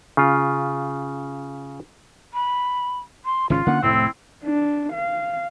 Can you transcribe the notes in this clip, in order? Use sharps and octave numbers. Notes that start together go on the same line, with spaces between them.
C#3 F4
B5
C6
G#1 C#3 C#4 F4
D3 A#3 C#4 F#5
F1 A2 A3 C4 E4
D4
F5